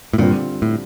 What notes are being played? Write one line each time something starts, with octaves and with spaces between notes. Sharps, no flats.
A2
G2 A#2 D3 G3 C4 F4
A2